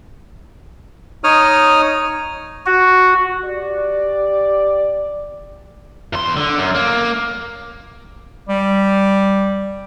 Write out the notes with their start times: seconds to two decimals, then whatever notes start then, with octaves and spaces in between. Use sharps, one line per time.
1.24 D#4 C#5 D#6 F6
2.66 F#4
3.45 G4 D5
6.13 E2 C6
6.37 D3
6.58 F#2
6.75 A#3
8.49 G3